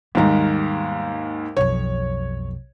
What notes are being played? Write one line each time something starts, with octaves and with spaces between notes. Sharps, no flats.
D#2 G#2 D#3 G3 B3
B1 F2 C#5